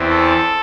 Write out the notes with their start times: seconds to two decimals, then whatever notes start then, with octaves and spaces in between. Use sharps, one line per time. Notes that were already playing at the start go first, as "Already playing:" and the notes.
Already playing: E2 E3 C4
0.10 A4